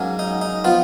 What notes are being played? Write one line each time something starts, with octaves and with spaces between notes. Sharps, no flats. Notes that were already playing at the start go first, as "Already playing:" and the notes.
Already playing: G#2 F#3 A#3 C#4
D#4
D#4
F3 B3 F4